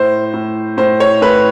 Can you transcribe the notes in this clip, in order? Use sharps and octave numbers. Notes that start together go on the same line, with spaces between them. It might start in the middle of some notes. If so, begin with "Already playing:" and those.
Already playing: A2 C5
A2
A2 C5
C#5
A2 B4